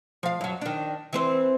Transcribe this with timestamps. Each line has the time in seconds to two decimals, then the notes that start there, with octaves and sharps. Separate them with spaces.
0.23 F3 F5
0.41 F#2 F#3
0.61 D#3 D4
1.13 E3 C4 C5